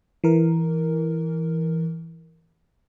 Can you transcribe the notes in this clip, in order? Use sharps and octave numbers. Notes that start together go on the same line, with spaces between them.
E3 A#4